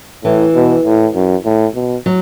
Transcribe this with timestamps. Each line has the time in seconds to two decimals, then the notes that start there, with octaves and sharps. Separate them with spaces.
0.24 A2 E3
0.55 B2
0.86 A2
1.15 F#2
1.45 A2
1.75 B2
2.06 F#3